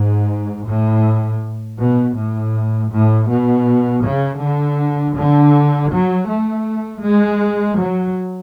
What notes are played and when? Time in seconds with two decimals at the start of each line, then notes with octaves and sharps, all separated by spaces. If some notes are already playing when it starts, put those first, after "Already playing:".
Already playing: G#2
0.67 A2
1.79 B2
2.17 A2
2.92 A2
3.30 B2
4.04 C#3
4.42 D3
5.17 D3
5.92 F#3
6.30 A3
7.04 G#3
7.79 F#3